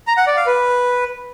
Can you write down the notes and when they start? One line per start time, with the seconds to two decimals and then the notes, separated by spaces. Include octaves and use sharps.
0.07 A#5
0.17 F#5
0.27 D5
0.37 F5
0.47 B4